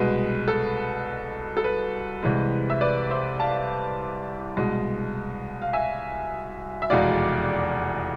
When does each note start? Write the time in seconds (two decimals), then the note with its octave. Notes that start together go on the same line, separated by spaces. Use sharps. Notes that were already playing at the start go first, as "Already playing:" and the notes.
Already playing: C2 B2 G#3 B4
0.48 A4
1.57 A4
1.64 B4
2.23 C2 C3 E3 G#3
2.70 E5
2.81 B4 D5
3.10 C5 E5
3.40 F5 A5
4.57 C2 B2 G#3
5.62 F5
5.73 E5 G#5
6.82 E5
6.90 F1 E2 B2 G#3 D5 F5